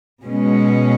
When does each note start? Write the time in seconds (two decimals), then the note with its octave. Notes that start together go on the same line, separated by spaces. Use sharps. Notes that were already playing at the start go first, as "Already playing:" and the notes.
0.23 B2 G#3 C#4